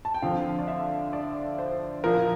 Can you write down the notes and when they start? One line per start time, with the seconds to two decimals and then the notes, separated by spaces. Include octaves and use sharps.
0.05 A5
0.14 G5
0.22 D3 F3 C4 F5
0.59 D5
0.68 E5
1.13 D5
1.58 C5
2.04 A#2 F3 A#3 A#4